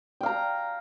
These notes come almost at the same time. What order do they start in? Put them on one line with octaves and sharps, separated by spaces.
G5 F5 A#5